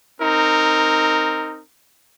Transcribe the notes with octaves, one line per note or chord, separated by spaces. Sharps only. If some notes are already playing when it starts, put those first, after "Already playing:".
C4 D#4 A#4